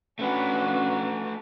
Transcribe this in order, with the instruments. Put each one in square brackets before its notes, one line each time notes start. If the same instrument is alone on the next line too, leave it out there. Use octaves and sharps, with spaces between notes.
[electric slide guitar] A3 B4 [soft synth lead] C#4 [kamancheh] D4 F#4